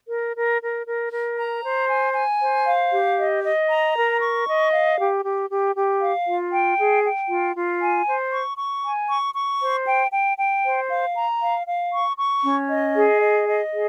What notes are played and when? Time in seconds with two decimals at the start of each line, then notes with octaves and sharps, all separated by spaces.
0.08 A#4
0.35 A#4
0.61 A#4
0.85 A#4
1.11 A#4
1.38 A#5
1.63 C5
1.89 G#5
2.14 G#5
2.41 C5
2.66 F5
2.92 G4
3.17 D#5
3.43 D#5
3.69 A#5
3.95 A#4
4.20 C#6
4.46 D#5
4.72 F5
4.98 G4
5.24 G4
5.49 G4
5.74 G4
6.00 F5
6.26 F4
6.52 G5
6.77 G#4
7.04 G5
7.28 F4
7.55 F4
7.80 G#5
8.06 C5
8.32 C#6
8.57 C#6
8.83 G#5
9.10 C#6
9.35 C#6
9.61 C5
9.86 G5
10.12 G5
10.38 G5
10.63 C5
10.89 F5
11.15 A#5
11.40 F5
11.66 F5
11.92 C#6
12.17 C#6
12.43 C#4
12.69 D#5
12.95 G#4
13.21 D#5
13.47 D#5
13.73 G#4